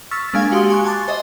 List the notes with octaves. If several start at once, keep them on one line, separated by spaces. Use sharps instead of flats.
C#6 E6 F6 A6 B6
G#3 A#3 D4 F5 G#5
F#4 G4 F5 C6 D#6
G#5 C#6 F#6
G#5 A5 C6 D6 A6
C5 D#5 E5